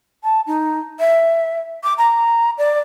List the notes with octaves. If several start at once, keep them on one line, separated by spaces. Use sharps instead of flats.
A5
D#4
E5
D6
A#5
D5